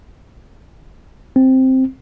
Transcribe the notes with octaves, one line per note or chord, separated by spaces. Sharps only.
C4